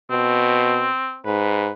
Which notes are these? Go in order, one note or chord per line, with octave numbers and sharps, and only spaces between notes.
B2 C4
G#2 B4